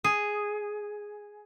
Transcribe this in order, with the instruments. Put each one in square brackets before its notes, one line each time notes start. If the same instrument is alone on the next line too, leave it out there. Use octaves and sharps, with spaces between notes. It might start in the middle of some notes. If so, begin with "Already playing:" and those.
[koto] G#4